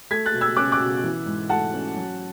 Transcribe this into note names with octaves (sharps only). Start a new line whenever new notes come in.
A3 G#6 B6
F#6 A6
B2
E6 G#6
C#4 D6 F#6
D6 F#6
B2
E3
G#2
A3 F#5 A5
C#4
F#3